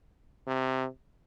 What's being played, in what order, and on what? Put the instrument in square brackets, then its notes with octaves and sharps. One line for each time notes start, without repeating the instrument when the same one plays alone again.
[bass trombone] C3